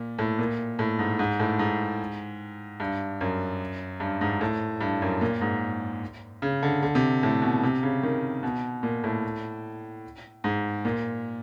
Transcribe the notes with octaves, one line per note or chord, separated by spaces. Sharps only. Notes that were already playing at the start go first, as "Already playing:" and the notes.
Already playing: A#2
A2
A#2
A2
G#2
G#2
A2
G#2
G2
F#2
G2
G#2
A2
G2
F#2
A#2
G#2
C#3
D3
D3
C3
A2
B2
C3
C#3
D#3
B2
A#2
A2
G#2
A#2